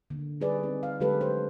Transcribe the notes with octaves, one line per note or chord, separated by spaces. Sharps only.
D3 A#3
G3 D#4 G#4 B4 D5
C4 D#4
F5
D3 F#3 G#3 G4 A4 B4
C5